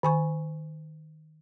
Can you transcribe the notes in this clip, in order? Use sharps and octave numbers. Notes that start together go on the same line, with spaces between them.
D#3 G#5 C#6